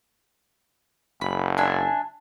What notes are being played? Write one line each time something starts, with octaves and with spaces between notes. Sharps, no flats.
F#1 B5
D4 E5 G#5